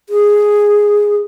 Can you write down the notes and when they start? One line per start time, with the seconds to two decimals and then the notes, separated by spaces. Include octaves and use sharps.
0.09 G#4